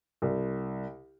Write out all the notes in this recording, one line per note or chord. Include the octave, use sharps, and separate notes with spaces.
C2